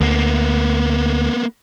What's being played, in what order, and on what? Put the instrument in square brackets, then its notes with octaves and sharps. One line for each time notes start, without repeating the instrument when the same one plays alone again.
[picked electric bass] D2 [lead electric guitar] A#3 B3